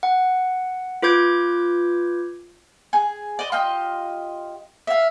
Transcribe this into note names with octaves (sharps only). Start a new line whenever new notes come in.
F#5
F4 B4 D6 G6 G#6
G#4
D5 D#5
F4 G4 D#5
E5 F5